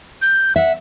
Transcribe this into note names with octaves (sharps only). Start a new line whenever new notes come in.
G6
E5 F#5